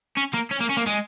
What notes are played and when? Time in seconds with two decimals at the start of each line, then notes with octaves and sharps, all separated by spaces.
0.17 C#4
0.34 A#3
0.51 C#4
0.60 A#3
0.69 C#4
0.77 A#3
0.86 G#3